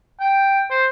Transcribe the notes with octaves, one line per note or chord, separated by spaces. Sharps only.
G5
C5